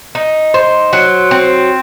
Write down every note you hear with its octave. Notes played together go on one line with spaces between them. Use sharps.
D#4
C5
F#3
C4